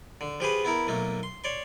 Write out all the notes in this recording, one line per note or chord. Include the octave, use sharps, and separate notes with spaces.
D3
F3 G4 G#4 B4
B3 E4 A#4
B1 A3 A#3
C6
C#5 D5 C6